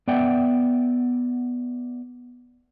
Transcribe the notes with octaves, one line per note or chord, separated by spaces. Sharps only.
B3 D5 E5 F#5 G5